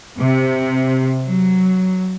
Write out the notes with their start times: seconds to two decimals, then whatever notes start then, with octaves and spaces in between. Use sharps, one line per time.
0.19 C3
1.24 F#3